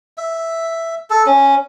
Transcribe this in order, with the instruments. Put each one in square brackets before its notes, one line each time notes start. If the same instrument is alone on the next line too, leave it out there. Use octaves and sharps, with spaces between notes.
[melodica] E5
A4
C#4